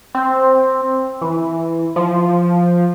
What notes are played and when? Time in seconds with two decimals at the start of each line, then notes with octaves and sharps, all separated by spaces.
0.15 C4
1.21 E3
1.96 F3